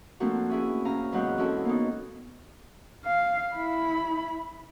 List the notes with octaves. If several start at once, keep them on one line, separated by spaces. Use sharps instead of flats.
F3 A3 A#3 C4 D4 F#4
C#4 E4 G#4
C3 C#4 F5 A#5
E2 G#2 F#3 F#6 G6
C4 C#4 E4 F#4 A4
A#3 B3 D#4
F5
E4 B5